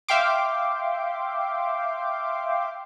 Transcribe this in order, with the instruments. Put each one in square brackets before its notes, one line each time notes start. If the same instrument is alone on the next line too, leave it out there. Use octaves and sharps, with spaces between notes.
[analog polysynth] E5 F5 G5 C6 D6